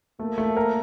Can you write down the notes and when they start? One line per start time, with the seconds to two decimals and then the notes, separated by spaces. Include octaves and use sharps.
0.19 A3 A#3
0.38 A3
0.57 A#4